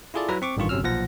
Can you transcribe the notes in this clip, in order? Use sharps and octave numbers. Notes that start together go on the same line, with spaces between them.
E4 F4 G#4 A4 D5
F#3 E4 B4 E5 A#5
C4 C#6 D6
A1 G2 D#3 F4 C#6
G1 C3 F#3 C#4 E6 F6
B1 A#2 F3 F#5 A#6